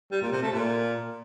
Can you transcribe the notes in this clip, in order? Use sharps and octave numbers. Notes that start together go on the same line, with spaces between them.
G3
A#2
C3
A3
A#2